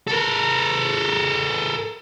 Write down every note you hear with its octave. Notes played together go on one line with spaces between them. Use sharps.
A4 A#4